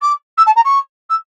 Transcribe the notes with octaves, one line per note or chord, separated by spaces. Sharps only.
D6
E6
A5
A#5
C#6
E6